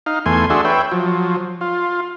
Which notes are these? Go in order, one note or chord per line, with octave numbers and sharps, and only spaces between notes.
D#4 F5
E2 A3 G#5 C6
D4 F#4 G#4 A4 E5 C6
B4 C#5 E5 G5
F3 F#3
F4